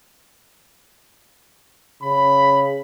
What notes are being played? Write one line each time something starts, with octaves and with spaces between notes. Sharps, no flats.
C#3 B5